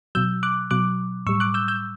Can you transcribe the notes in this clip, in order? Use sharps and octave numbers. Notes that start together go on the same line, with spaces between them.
B2 F#3 E6 G6
D6 F#6
B2 F#3 D6 F#6
A2 G3 C#6 E6
D6 F#6
E6 G6
E6 G6